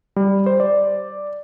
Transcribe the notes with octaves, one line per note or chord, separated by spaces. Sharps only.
G3
C5
D5